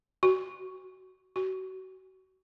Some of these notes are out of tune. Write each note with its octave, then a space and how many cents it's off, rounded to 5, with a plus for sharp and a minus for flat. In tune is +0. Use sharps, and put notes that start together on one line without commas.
F#4 +20
F#4 +30